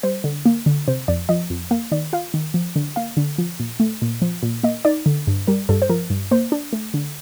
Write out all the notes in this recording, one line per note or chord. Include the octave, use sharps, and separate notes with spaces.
G3 C5
D3
A#3
D3
C3 C5
F2 D5
F3 D#5
F2
A#3 F5
D#3 D5
F4 F5
D#3
F3
D3
A#3 F5
D3
F3
A#2
A3
A#2
F3
A#2
A#3 D#5
D#4 D5
D3
G2
G3 A#4
G2 A4
C5
F3 A#4
G2
A#3 C5
D4
A3
D3